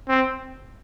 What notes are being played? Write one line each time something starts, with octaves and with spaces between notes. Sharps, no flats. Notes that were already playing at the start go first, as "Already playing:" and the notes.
C4